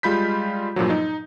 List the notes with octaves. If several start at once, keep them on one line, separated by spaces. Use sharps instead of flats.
G3 G#3 F4 B5 G6 B6
G2 A#2 F3 F#3
D#4